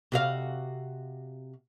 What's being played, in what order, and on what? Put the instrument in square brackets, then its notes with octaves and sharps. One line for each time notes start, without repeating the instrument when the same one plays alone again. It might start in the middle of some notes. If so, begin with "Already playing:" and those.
[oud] C3 F#4 F5